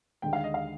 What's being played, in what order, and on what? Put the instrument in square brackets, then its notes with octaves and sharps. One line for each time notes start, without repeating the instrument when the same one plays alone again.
[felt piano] D#2 D3 G#3 [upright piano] G5
[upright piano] F5
D#5
F5